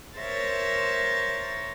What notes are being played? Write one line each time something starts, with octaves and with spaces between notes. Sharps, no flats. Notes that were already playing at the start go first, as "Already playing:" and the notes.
A#4 C5 C#5 E5 A6